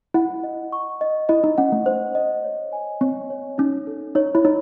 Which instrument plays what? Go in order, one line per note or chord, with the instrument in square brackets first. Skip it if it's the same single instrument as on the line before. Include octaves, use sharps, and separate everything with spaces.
[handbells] E4 [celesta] F#5
[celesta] D#5
C#6
D#5
[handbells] E4 [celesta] D#5
[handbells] D#4
[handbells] C#4 [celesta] F#5
[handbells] A3
[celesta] C5
D#5
C#5
G#5
[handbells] C4 [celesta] C#5
[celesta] C#5
[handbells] C#4 [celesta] D#4
[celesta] A4
[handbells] D#4 [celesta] C#5
[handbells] E4
[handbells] D#4 [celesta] C#5